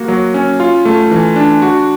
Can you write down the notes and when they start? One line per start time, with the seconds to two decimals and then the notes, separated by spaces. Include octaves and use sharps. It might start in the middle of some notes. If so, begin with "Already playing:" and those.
Already playing: A#3 F#4
0.08 F#3
0.34 C#4
0.60 F4
0.85 A3
1.11 E3
1.36 D4
1.62 F#4